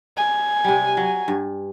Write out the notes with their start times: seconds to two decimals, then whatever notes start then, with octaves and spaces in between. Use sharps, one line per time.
0.17 G#5
0.64 C3 G3
0.97 F#3
1.28 G2